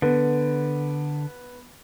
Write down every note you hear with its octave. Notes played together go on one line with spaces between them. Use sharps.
D3 B3